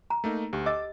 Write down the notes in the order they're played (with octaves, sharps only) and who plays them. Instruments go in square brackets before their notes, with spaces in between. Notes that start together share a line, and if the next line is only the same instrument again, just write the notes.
[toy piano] A#5
[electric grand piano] A3 A#3 D#4
[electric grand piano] D2 [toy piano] G4
[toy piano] D#5 [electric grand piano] D6 E6 A6